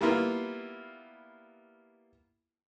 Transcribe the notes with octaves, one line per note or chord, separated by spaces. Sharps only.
G3 A#3 B3 E4 F4